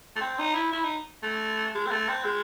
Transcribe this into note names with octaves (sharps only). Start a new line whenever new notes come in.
A3
C4
D#4
E4
E4
D#4
A3
G#3
C4
A3
C4
G#3